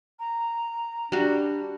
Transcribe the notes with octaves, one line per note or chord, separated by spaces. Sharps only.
A#5
G3 D4 F#4